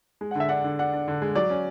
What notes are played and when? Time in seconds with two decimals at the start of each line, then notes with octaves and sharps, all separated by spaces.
0.21 G#3
0.31 F#5
0.35 D3 E5
0.49 D4 F#5
0.64 D3
0.79 D4 F#5
0.93 D4
1.08 D3
1.22 G#3
1.35 F#3 D5
1.50 C#4